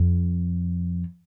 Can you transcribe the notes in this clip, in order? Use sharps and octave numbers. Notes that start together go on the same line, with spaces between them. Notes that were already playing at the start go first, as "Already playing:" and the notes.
Already playing: F2